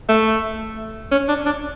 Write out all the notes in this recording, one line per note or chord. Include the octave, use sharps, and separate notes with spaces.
A3
C#4
D4
D4